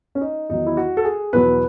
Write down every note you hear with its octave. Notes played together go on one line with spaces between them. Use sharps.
C#4
D#4
E2 D#3 F#3 D#4
E4
F#4
A4
G#4
E2 B2 F#3 B4